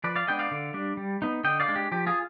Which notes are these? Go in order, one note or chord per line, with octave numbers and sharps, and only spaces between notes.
F3 B4 D5
D5 F5
G#3 B3 D4 D#5 G5
D5 F5
D3
G3 D4
G3
B3 D#4
D3 D#5 G5
D5 F5
G#3 D4
G4
F3 G4
F4 G#4